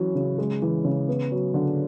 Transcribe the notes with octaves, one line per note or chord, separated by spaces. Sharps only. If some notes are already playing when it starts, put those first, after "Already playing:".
Already playing: E3 F#3 C#4
C#3
G#3
E3
C#3
B3
F#3
D3